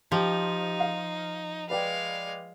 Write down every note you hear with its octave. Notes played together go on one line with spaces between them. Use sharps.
F3 D#4 G4
F5
G#3 B4 D5 F5 G5